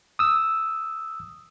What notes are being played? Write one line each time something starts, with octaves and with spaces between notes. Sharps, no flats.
D#6 E6